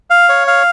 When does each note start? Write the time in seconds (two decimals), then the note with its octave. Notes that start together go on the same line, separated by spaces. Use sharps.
0.10 F5
0.29 C#5
0.47 F5